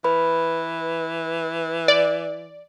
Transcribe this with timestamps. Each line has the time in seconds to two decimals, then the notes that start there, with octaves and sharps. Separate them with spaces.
0.04 E3 B4 B5
1.88 D5